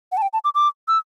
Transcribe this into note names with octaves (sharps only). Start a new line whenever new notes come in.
F#5
A5
G5
A5
D6
D6
E6